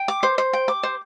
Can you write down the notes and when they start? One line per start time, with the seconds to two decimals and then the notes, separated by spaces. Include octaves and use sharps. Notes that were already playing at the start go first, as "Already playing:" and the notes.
Already playing: G5
0.08 D6
0.23 C5
0.38 C5
0.53 G5
0.68 D6
0.83 C5